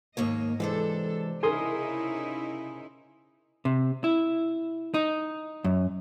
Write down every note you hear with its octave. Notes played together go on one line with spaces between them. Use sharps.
D#2 G#2 A#3 C#5 D#5
C3 E3 G#3 D4 A4 C5
C#3 D#4 E4 G#4 A#4 G#5 C6 D#6
C3
E4
D#4
F#2